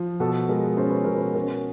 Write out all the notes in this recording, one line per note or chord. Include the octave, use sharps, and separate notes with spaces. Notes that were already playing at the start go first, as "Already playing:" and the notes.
Already playing: F3
B2 A4
G#3 A#4
C#4 C5
B4
B2 A#4
B4
C#4 A#4